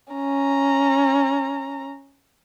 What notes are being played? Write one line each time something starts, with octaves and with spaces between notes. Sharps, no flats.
C#4 A#5